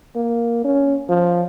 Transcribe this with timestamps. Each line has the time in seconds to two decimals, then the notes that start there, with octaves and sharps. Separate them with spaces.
0.16 A#3
0.64 C#4
1.09 F3